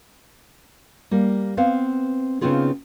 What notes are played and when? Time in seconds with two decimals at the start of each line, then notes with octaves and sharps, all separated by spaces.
1.11 G3 A#3
1.57 B3 C4 F5
2.41 C#3 B3 C4 D#4 F4 G#4